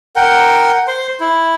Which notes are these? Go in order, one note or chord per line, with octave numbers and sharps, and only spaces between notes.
A#4 F#5 G5
C5 C6
E4